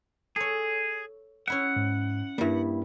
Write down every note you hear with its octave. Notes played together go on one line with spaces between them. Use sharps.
G#4 A4 C#5
C#4 E4 E5 F#5
G#2
G2 G3 A#3 E4